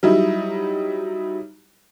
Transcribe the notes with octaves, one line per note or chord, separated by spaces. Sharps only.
F#3 G3 D#4 E4